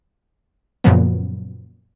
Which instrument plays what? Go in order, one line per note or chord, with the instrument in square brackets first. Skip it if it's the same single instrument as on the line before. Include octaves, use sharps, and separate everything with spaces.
[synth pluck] F#2 A#2 C#3 F3 F#3 B3